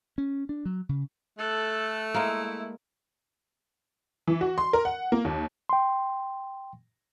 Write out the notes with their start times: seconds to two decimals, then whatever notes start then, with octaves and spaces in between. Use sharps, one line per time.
0.18 C#4
0.49 D4
0.65 F#3
0.89 C#3
1.38 A3 A4 F#6
2.14 G#3 A#3 E4
4.27 E3
4.41 F#4
4.58 C6
4.73 A#4
4.85 F#5
5.12 A#3
5.25 D#2
5.69 G5 C6